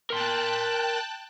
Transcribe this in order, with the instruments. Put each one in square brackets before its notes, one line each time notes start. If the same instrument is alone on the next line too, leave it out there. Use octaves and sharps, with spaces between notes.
[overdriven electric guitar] A#4 C6 [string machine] G5 A5 F#6